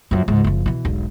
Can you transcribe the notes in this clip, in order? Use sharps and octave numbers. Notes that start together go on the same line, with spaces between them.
F#2 F3
C#2 G#2
F#1 F3
B2 E3
E1 B1